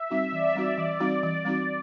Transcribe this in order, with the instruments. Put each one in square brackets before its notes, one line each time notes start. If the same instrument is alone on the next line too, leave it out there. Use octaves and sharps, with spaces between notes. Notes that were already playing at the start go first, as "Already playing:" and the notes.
Already playing: [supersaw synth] E5
[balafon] G3 C4 D#4 F#4
[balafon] E3 [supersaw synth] D5
[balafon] G3 C4 D#4 F#4
[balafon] E3 [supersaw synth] D5
[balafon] G3 C4 D#4 F#4
E3
G3 C4 D#4 F#4